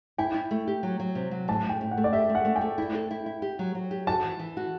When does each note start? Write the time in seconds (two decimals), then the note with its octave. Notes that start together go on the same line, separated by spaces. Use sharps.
0.18 E4 G5
0.34 E4
0.51 A3
0.67 G4
0.83 F#3
0.99 F#3
1.15 C3
1.31 F#3
1.48 A2 A5
1.65 A2 G5
1.81 A2
1.91 F#5
1.97 A3
2.04 D5
2.13 G4 E5
2.29 A3
2.35 F#5
2.45 A3
2.56 G5
2.61 A3
2.78 E4
2.95 A4
3.11 E4
3.26 E4
3.42 G4
3.59 F#3
3.75 F#3
3.91 G4
4.07 F#4 A5
4.24 E3
4.39 E3
4.57 F#4